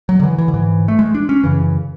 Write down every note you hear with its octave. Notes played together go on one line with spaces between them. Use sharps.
F#3
D3
E3
E3
D3
G#2 E3
A3
G#3
D4
C#4
F#2 C#3 E3